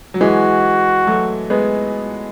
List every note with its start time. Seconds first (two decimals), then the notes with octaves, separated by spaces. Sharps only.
0.14 F#3
0.21 E3 G#3 F#4
1.07 F#3 A3
1.50 G#3 B3